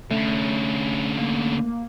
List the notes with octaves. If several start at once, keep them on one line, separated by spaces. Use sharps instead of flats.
D3 A3 C#4
A#3